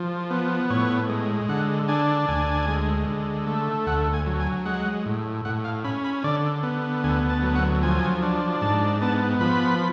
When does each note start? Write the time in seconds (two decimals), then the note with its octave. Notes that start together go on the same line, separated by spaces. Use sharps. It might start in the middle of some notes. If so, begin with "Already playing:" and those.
Already playing: F3
0.30 B3
0.70 A2 C#5
1.09 G#3
1.49 D3 F#5
1.88 D4 G#5
2.28 D2 G#5
2.68 G#3
3.07 D3
3.47 A3
3.86 D2 F#5
4.13 G#5
4.27 F#3
4.40 G#5
4.66 G#3 F#5
5.06 A2
5.45 A2 F#5
5.64 F5
5.84 C#4 B5
6.04 B5
6.24 D3 D5
6.63 B3
7.04 D2 G#5
7.30 A5
7.43 F#3
7.56 F#5
7.82 F3 G#5
8.22 D4
8.61 G#2 A5
9.01 B3 A5
9.41 F3 B5